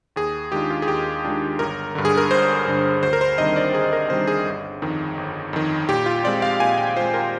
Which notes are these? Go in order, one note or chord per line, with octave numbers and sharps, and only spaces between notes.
D#2 G#4
D#3 G#3 D4 F4 G4
F4
G#4
D#2 G4
D#3 G#3 D4 F4
G1 A#4
G2 D3
G#4
A#4
G1 C5
G2 D3
D2 C5
A#4
C5
C3 D#3 G3 D4 D#5
D5
D2 G#4
A#4
C3 D#3 G3 D4 C5
G#4
G1
F2 D#3
G1
F2 D#3
A#2 G4
F4
G#3 C4 F4 D5
F5
A#2 G#5
G5
G#3 C4 F4 C5
A#4